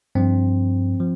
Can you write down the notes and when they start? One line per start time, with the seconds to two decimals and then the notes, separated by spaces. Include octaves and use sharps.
0.15 G2 F3 C4
1.00 F3